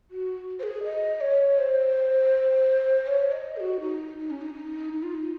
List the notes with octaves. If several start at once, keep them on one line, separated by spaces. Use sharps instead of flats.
F#4
C5
G#4
D#5
C#5
C5
C#5
D#5
G#4
F#4
D#4
D#4
C#4
D#4
D#4
D#4
F4
D#4